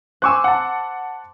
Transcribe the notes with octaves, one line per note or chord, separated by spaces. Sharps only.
C5 G#5 C#6 D6 E6 F#6
F#5 A5